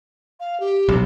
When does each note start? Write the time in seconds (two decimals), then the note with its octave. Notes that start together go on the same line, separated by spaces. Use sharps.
0.40 F5
0.60 G4
0.89 B1